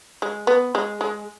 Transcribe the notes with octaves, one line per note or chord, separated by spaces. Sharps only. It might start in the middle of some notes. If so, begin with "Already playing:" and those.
G#3
B3
G#3
G#3